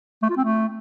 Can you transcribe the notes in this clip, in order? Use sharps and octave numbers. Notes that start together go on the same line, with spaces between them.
A3
F4
C4
A3